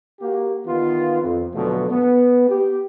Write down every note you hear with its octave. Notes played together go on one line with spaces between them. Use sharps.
A#3 F#4 G4
D#3 E3 B3 F4
F2
E2 B2 D3 F3 F#3 A3
B3
G4